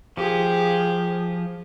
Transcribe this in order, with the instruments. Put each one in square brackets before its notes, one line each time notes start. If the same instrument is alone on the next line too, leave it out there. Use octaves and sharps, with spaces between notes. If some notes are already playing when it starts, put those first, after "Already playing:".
[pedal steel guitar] F3 [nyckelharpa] G4 G#4